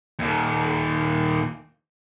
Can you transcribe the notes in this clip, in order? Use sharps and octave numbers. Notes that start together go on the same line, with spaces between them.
D#2 A#2